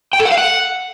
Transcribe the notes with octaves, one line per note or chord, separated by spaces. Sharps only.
G5
A4
F#5
F5
F#5